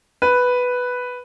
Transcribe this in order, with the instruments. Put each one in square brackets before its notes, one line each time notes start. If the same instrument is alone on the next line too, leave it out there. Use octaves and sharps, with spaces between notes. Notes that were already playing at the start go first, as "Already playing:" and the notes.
[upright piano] B4